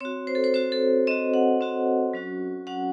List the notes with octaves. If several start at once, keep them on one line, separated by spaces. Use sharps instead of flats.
C4 F#4 C#5
C5
A4
C5
C4 F#4 C5
A4
C4 F#4 D#5
F#5
C4 F#4
F#3 C#4 F#4
F#3 C#4 F#4 F#5